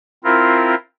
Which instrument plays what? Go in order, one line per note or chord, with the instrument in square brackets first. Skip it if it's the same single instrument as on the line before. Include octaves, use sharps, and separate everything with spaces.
[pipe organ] C4 E4 F4 A#4